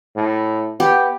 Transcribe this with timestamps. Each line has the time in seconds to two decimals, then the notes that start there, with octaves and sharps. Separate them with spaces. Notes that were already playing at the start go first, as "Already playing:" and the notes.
0.16 A2
0.80 B3 G4